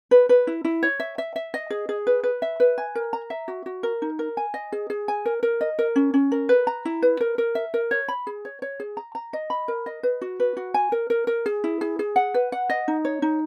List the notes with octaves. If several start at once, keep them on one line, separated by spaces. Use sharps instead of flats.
B4
B4
E4
E4
C#5
E5
E5
E5
D#5
G#4
G#4
B4
B4
E5
B4
G#5
A#4
A#5
E5
F#4
F#4
A#4
D#4
A#4
G#5
D#5
G#4
G#4
G#5
A#4
A#4
D#5
A#4
C#4
C#4
A#4
B4
A#5
E4
B4
A#4
A#4
E5
A#4
C#5
B5
G#4
C#5
C#5
G#4
A#5
A#5
D#5
B5
A#4
D#5
B4
F#4
B4
F#4
G#5
A#4
A#4
A#4
G#4
E4
G#4
G#4
F#5
B4
F#5
D#5
D#4
C#5
D#4